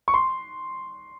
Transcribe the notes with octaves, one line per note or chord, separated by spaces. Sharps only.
C#6
C6